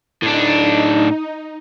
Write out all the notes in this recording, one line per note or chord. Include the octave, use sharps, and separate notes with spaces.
A2 D4 D#4